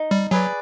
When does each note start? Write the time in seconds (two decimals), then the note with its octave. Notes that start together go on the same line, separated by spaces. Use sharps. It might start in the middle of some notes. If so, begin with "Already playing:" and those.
Already playing: D#4
0.11 G3
0.31 F#3 G#4 B4 D5